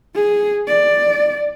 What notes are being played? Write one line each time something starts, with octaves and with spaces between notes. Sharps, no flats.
G#4
D5